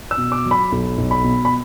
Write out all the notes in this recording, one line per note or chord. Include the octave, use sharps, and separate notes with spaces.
E6
B2
D6
F#3
B5
B1
B1
B5
B2
B5